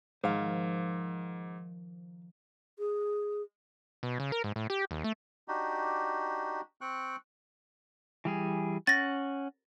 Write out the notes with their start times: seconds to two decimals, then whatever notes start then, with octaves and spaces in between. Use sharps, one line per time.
0.24 G#2 D#3 F3 C5 F5
2.79 G#4
4.03 B2
4.20 C#3
4.32 A#4
4.44 G#2
4.56 A2
4.70 G4
4.91 D#2
5.04 A3
5.48 D4 D#4 F#4 G4
6.81 C4 G5 C#6 F#6
8.25 E3 G3 G#4
8.87 C#4 F#5 A6 A#6